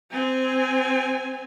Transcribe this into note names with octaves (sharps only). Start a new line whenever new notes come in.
C4 G#5